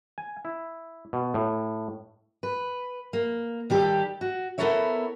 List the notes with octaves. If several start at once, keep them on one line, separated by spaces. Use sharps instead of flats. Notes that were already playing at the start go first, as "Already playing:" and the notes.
G#5
E4
B2
A2
B4
A#3
D#3 G3 G4 A4
F#4
B3 E4 A4 A#4 C#5 E5